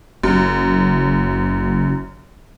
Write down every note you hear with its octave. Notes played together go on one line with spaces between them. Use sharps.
F#1 F#2